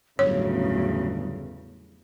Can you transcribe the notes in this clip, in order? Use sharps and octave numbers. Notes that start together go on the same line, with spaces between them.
G1 E2 A2 C#3 F#3 C#5